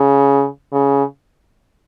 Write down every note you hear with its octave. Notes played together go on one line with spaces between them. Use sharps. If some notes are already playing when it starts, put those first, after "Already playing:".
Already playing: C#3
C#3